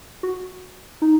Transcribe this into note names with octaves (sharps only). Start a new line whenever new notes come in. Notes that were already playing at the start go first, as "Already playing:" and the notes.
F#4
D#4